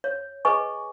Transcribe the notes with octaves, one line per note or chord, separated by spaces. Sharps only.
C#5
G#4 B4 D#5 G#5 C#6